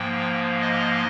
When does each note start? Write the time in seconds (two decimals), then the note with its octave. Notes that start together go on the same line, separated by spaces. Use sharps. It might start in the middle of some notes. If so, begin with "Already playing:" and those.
Already playing: G#2 F3 A#3 G5
0.61 D#5